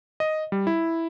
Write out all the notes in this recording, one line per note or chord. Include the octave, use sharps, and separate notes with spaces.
D#5
G3
E4